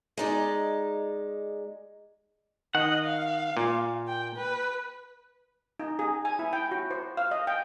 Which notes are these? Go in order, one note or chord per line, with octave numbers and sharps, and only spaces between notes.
G#3 D#4 D5
D#3 D#5 F#5
F5
A#2
G5
B4
D#4
G#4
G#5
E4
G5
F#4
C5
F5
D#5
G5